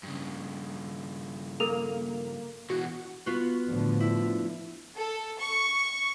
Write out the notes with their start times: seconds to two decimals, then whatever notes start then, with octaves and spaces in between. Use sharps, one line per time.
0.03 G2 C#3
1.60 A#3 A4 A#4 F7
2.70 B2 E3 F#4
3.26 B3 F4 F#4
3.70 A2 D3 F3
4.00 E4
4.95 A4
5.39 C#6